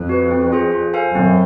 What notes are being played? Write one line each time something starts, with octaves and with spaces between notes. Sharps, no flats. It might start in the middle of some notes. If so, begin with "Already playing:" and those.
Already playing: F2
F#4 B4
C4
F4 G#4 C5
F4
A4 C5 F5 G#5
F#2 C4